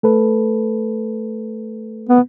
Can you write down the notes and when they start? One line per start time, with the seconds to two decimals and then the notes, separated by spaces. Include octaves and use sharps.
0.03 A3 A4 B4
2.09 B3